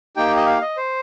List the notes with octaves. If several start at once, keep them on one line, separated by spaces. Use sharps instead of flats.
A#3 D#4 G4 G5
D#5
F5
D#5
C5